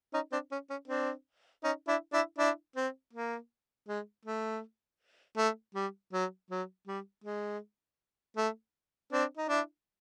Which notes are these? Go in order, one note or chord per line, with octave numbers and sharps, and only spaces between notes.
C#4 D#4
C4 D4
C#4
C#4
C4 D4
C#4 D#4
D4 E4
D4 E4
D4 E4
C4
A#3
G#3
A3
A3
G3
F#3
F#3
G3
G#3
A3
C4 D4
D#4
D4 E4